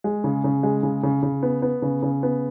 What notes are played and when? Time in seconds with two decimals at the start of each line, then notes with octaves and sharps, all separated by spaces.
0.04 G#3
0.24 C#3
0.44 C#3
0.63 G#3
0.83 C#3
1.03 C#3
1.23 C#3
1.43 B3
1.62 B3
1.82 C#3
2.02 C#3
2.23 B3